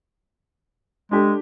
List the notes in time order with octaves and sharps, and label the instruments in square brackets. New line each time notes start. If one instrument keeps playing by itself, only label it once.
[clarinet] G#3 [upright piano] D4 G4 A4